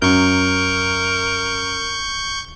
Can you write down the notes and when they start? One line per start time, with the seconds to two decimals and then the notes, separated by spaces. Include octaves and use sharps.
0.02 F#2 A#4 C#6 G6